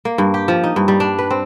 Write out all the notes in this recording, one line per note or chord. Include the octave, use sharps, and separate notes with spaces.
A#3
G2
G4
F3
D#4
G2
G3
D4
B4
C4